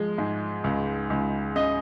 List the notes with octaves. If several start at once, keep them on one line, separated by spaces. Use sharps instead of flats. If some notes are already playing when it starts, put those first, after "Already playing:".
Already playing: F3 G#3
G#2
C#2
C#2
C#3 D#5